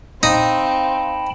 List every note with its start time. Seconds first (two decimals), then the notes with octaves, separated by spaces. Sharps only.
0.23 C4 D#4 F5 G5 A5 B5